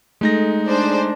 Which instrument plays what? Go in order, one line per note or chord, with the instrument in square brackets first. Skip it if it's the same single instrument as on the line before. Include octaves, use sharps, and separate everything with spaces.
[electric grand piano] G#3 D#4 A#6 [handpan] A3
[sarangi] D4 [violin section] G#4 C5 D5